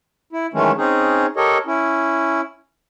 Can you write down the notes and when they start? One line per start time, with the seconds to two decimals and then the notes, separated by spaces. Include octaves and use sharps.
0.33 E4
0.54 D#3 E3 F#3 G#3 A3 C#4
0.78 C4 C#4 D#4 G#4
1.37 G4 A4 A#4 C#5 D#5
1.66 C#4 E4